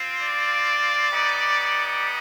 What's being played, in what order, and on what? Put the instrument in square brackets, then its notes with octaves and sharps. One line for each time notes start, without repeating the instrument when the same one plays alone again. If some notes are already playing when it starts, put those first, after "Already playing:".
Already playing: [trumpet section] C4 F4
D5
B3 D#4 G4